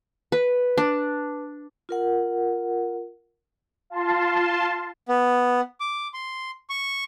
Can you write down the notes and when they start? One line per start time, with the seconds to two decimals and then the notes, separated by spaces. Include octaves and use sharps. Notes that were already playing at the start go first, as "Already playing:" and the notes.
0.32 B4
0.78 D4
1.89 F4 A#4 F#5
3.90 F4 A5 C6
5.09 B3
5.80 D6
6.14 C6
6.70 C#6